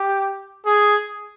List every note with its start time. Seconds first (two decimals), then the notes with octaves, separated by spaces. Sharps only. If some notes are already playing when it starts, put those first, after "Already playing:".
Already playing: G4
0.66 G#4